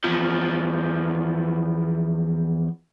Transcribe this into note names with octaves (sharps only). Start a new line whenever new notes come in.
E2 F3